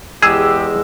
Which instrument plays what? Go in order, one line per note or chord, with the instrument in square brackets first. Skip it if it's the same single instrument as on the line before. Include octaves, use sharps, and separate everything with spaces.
[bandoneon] E2 G#3 [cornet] G4 [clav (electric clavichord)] G#4 [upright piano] E6